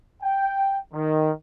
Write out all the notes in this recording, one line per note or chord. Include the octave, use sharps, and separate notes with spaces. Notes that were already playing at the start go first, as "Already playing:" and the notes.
G5
D#3